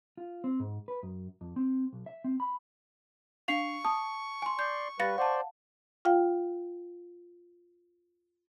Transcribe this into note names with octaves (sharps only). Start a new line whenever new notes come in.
F4
C4
G#2
B4
F#2
F2
C4
B1
E5
C4
B5
D4 F5 C#6 C7 F7
A5 D#6
G#5 C6
D5 C6 G6
G3 B4 F5 A6 A#6 C#7
C5 D5 F#5 A5
F4 F5 G5